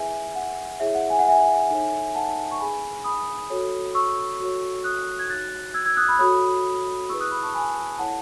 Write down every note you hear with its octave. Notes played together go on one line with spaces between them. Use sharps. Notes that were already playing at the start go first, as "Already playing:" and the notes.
Already playing: E4 G#4 B4 E5 G#5
F#5
E4 G#4 C#5 E5
F#5
G#5
F#5
E5 G#5
D#4 A4 C#5
F#5 A5
C#6
D#4 G#4 B4 G#5 B5
B5 D#6
F#4 A4 C#5
C#6 E6
F#4 A4 C#5
D#6 F#6
G#6
D#4 F#4 C#5 F#6 A6
E6 G#6
E6 G#6
D#6 F#6
B5 D#6
F#4 A4 C#5 B5 D#6
E4 G#4 B4 C#6 E6
D#6 F#6
B5 D#6
A5 C#6
G#5 B5
E4 A4 C#5 F#5 A5